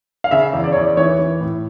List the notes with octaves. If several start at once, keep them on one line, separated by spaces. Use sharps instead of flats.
F5
C#3 E5
E2
D5
E2 C#5
D5
E3 C#5
E3
A2